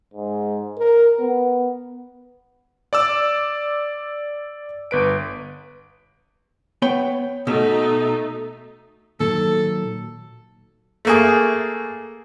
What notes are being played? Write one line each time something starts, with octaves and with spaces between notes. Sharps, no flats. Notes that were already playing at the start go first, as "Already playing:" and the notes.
G#2
A#4
B3
D5 D6 E6
G1 B4 D7
B3 C#5 G5
B2 A3 D#4
A#2 D#3 F#3 A4
A3 A#3 G#4